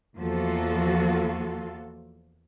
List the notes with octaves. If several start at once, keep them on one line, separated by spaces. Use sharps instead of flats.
E2 F3 A#3 F4 F#4 A4